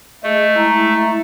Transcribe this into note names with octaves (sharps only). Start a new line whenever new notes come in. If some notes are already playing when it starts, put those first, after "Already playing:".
A3 G#4 D#5
G#3 E4 A#5